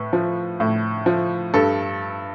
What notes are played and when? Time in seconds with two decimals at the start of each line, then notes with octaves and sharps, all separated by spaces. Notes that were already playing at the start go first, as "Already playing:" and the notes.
Already playing: A2 B4
0.13 F3
0.60 A2
1.06 F3
1.54 G2 A4